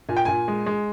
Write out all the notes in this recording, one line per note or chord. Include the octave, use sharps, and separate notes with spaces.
A#2 G#5
G5
A#2 G#5
G#3
G#3